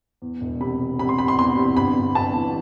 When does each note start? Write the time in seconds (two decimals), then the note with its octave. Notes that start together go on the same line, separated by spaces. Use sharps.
0.22 E2
0.41 E1
0.60 C3 B5
0.80 C3
0.99 C3 B5
1.09 C6
1.18 C3 B5
1.28 C6
1.39 E2 C6
1.57 C3
1.77 G1 B5
1.97 G1
2.15 G1 A5
2.35 E3